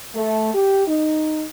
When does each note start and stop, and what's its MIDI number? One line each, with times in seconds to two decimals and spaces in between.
0.15 0.52 57
0.54 0.86 67
0.87 1.45 63